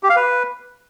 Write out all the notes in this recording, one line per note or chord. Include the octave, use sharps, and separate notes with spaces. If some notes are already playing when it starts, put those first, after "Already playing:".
G4
F5
B4